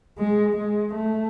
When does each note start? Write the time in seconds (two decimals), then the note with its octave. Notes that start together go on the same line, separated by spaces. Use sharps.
0.19 G#3
0.57 G#3
0.95 A3